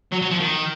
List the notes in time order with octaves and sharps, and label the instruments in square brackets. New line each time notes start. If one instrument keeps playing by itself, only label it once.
[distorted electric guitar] F#3
F#3
F3
D#3